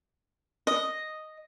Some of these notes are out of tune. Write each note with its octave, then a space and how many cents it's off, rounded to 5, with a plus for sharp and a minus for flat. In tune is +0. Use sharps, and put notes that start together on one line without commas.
D#5 +0 D#6 +0